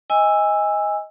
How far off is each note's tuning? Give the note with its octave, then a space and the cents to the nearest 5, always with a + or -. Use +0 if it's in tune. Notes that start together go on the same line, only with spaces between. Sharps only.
D#5 +20 G#5 -20 E6 +0